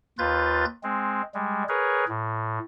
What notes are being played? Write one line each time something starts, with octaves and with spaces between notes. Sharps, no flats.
D#2 F4 B4 G6 A6
G#3 C4
G3 G#3
G#4 A#4 B4 C#5
A2